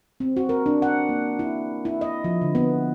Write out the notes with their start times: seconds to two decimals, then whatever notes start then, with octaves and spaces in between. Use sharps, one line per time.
0.20 C4
0.37 F#4
0.49 A#4
0.66 D4
0.82 F#5
1.09 A#3
1.39 E4
1.85 E4
2.01 D#5
2.24 F3
2.42 D3
2.55 B3